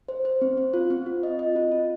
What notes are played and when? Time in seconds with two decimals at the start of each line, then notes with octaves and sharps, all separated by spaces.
0.08 C5
0.25 C5
0.42 C4
0.57 C4
0.74 F4
0.90 C4
1.06 F4
1.23 D#5
1.39 D#5
1.56 F4
1.72 F4